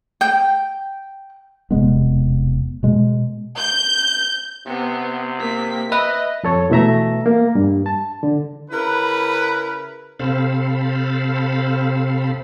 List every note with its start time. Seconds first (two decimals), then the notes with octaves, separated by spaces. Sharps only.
0.21 G5
1.71 E1 C3 G#3 B3
2.83 B2 G#3
3.57 G6
4.67 C3 B3
5.39 A#3 B6
5.92 B4 D#5 E5
6.43 F2 A4 C#5
6.70 B2 E3 A3 E5 A#5
7.26 A#3
7.55 G2
7.86 A5
8.23 D3
8.70 C#3 E4 A#4 B4
10.20 C3 C4 A4 C5 F5 B5